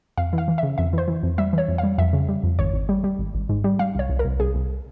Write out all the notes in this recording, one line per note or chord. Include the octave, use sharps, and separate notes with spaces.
F2 F5
E3
F5
E3
C#3 E5
F2 E5
E3 C5
E3
F2
G3 E5
E3 C#5
F2
F5
G3
F2 E5
C#3
G3
F2
G#1 C#5
G#1
G3
G3
G#1
G#1
G#2
G3
G3 F5
C2 C#5
C2
A#4
C2
C2 G#4
C2